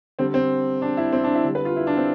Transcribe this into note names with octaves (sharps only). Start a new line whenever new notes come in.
D3 G3 C4
C4
D4
E4
C4
D4
E4
D3 G3
B4
F4
E4
D4
C4